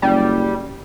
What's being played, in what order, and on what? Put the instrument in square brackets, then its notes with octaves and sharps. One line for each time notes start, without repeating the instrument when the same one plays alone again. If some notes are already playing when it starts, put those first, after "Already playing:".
[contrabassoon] F#1 [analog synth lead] G3